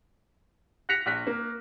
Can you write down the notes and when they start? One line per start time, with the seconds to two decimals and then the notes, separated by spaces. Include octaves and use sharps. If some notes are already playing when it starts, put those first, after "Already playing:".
0.89 F#6 A#6 B6 C#7 F7
1.06 A#1 F#6 B6
1.27 A#3